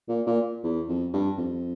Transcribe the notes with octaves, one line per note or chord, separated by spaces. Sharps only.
A#2
A#2
E2
F2
G2
F2